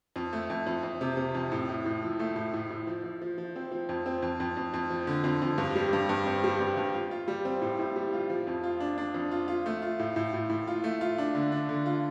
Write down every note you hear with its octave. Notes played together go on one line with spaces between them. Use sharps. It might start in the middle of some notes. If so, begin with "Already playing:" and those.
F2
A3
F2
F2
F2
C3
C3
F2
A2
A2
A2
F3
A3
A2
A2
A2
F3
F3
F3
F3
C4
F3
F2
C4
F2
F2
F2
F2
F3
D3
F2
F2
G2
G3
G2
G2
C4
G3
G2
G2
F4
F4
G3
C4
A2
A2
G3
F4
F3
F2
F4
D4
D4
F2
F4
F4
A3
F4
A2
A2
A2
A2
F4
A3
F4
D4
D3
D4
D3
F4